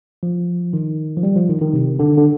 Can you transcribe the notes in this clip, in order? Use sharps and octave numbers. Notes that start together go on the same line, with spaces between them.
F3
D#3
F3
G3
F3
D#3
D#3
C3
D3
D3